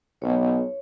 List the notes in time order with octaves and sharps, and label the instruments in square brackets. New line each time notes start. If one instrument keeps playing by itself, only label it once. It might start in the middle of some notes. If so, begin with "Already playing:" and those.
[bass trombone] B1 [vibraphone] C#5